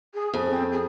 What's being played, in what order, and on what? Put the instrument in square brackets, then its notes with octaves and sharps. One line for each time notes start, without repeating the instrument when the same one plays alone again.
[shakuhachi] G#4
[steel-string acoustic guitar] F2
[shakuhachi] C4
G#4